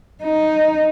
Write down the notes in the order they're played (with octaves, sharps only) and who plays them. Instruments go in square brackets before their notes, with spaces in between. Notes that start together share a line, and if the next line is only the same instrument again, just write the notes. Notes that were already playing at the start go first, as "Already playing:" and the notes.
[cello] D#4